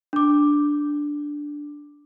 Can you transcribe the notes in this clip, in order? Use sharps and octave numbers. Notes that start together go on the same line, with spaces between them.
D4 D6